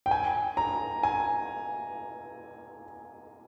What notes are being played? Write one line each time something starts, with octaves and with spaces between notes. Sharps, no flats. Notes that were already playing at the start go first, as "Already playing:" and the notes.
G5
G#5
A#5
G#5